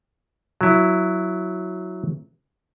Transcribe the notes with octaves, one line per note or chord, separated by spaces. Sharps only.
F#3 E4